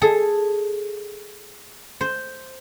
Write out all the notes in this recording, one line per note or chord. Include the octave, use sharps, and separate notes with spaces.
G#4 A4
C5